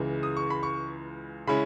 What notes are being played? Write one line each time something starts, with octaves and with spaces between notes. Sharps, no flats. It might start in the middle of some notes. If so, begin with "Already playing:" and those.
Already playing: C#2 C#3 E3 G#3
D#6
C#6
B5
C#6
C#3 G#3 C#4 E4 B5